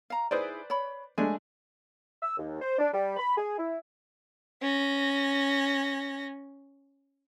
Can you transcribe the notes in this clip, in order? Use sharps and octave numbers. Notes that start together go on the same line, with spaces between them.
F5 A#5
D#4 E4 G#4 B4 C5 D5
C#5 B5
G#3 A3 D4 G#5
E6
D#2
C5
D4
G3
B5
G#4
E4
C#4 A#6